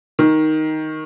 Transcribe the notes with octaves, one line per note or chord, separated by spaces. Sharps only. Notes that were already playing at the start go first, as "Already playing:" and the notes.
D#3